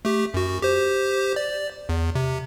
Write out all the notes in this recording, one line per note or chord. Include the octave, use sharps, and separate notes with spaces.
A3 G4
F#2 F#4
G4 C5
D5
E2
C3